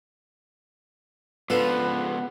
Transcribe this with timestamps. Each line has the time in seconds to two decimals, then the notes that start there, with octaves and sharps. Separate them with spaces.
1.50 C#2 F3 B3 D4 F4 A4 B4